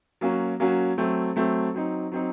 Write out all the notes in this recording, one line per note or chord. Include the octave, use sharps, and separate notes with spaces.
F#3 A#3 C#4 F#4
F#3 A#3 C#4 F#4
F#3 A3 C4
F#3 A3 C4
F#3 C4 D#4
F#3 C4 D#4